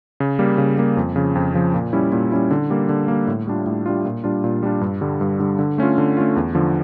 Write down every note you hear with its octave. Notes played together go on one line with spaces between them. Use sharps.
C#3
G3 A#3
C#3
G3 A#3
F2
C#3 F3
F2
C#3 F3
A#2
G3 C#4 E4
A#2
G3 C#4 E4
D3
G3 A#3
D3
G3 A#3
A2
G3 D4 F4
A2
G3 D4 F4
A#2
G3 D4 F4
A#2
G3 D4 F4
G2
D3 G3
G2
D3 G3
D3
A3 C#4 F4
D3
A3 C#4 F4
E2
D3 F3